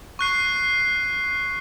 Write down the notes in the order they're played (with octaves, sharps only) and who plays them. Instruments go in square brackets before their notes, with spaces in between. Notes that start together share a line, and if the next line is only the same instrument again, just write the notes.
[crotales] C#6 F#6 C7